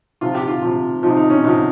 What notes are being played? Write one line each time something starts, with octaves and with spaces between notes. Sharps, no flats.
C3 F3 F4
G4
F4
C3 F3
C3 F3 D#4
D#4
C#4
C3 F3 D#4